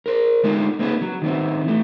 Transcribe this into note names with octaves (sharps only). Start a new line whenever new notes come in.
A#4 C5
D3 G#3 B3 D#4 F4 A4
A#3 C4 D#4 G#4 A4 B4
F#3
D#3 B3 C4
E3 A3